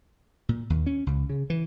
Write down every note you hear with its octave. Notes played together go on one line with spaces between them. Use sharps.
A#2
D#2
C#4
C#2
C#3
E3